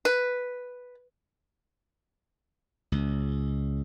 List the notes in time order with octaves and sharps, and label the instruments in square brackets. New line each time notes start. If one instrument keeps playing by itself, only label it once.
[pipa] B4
[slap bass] C#2